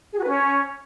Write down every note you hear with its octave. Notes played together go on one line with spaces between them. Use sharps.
G#4
F#4
B4
C#4